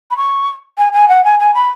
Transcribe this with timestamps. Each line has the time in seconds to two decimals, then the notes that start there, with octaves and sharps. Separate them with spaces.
0.11 B5
0.17 C#6
0.78 G#5
0.93 G#5
1.08 F#5
1.24 G#5
1.40 G#5
1.54 B5